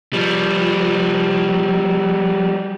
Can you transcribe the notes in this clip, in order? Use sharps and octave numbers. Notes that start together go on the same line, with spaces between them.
F3 G3